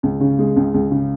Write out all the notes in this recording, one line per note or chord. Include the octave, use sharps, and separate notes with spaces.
C#2
C#3
G#3
C#2
C#2
C#3